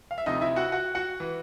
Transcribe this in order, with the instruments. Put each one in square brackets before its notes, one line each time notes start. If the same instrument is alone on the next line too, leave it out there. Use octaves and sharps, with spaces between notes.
[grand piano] F5
E5
D2 C3 F3 D#4 D#5
E4 E5
F#4 F#5
F#4 F#5
F#4 F#5
E3